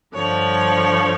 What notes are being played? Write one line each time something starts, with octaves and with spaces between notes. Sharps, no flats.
G2 D3 F3 C#5